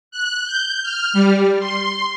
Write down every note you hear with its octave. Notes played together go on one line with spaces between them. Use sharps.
F#6
G6
F6
G3
C6